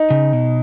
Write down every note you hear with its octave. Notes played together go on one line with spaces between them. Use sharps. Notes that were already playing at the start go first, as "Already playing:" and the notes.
Already playing: D#4
C#3
B2